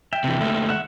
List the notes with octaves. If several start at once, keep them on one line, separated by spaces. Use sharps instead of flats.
E5 G5
C3 E3
D#2 A3
E5 F#5